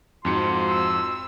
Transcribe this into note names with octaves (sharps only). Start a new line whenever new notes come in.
F2 G#2 F3 F#4 C6 C#7
E6